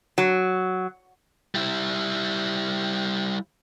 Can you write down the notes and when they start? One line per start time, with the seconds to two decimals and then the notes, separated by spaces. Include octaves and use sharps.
0.18 F#3
1.55 G3 E4